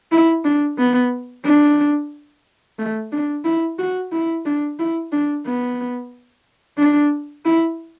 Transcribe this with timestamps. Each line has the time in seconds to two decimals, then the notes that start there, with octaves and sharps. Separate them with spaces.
0.12 E4
0.44 D4
0.78 B3
1.45 D4
2.79 A3
3.12 D4
3.45 E4
3.79 F#4
4.12 E4
4.45 D4
4.79 E4
5.12 D4
5.46 B3
6.78 D4
7.45 E4